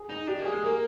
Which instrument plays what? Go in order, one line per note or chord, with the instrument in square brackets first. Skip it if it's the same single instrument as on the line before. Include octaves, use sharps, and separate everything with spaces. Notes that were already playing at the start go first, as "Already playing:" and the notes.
Already playing: [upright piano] G#4
[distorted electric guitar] D#4
[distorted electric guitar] D4 [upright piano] G4
[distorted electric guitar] A#3
[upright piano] G#4
[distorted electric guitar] G#3
[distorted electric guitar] A#3 [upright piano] A#4